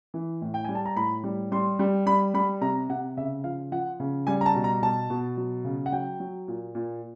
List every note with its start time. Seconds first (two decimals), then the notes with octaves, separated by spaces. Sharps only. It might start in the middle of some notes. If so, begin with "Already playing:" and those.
0.14 E3
0.41 A2
0.54 G5
0.65 G3 G#5
0.75 A5
0.86 A#5
0.96 A2 B5
1.24 G3
1.52 G3 C6
1.79 G3
2.06 G3 B5
2.34 G3 B5
2.61 C3 A#5
2.89 C3 F#5
3.17 C#3 E5
3.44 F3 F5
3.72 F3 F#5
4.00 C#3
4.27 G3 G#5
4.41 A#5
4.46 A5
4.55 B2
4.64 A#5
4.82 B2 A5
5.10 B2
5.37 F#3
5.65 C#3
5.86 F#5
5.92 F#3 G5
6.20 F#3
6.48 A#2
6.75 A#2